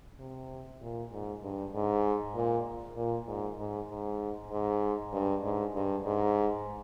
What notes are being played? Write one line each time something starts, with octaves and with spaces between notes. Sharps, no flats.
C3
A#2
G#2
G2
G#2
A#2
A#2
G#2
G#2
G#2
G#2
G2
G#2
G2
G#2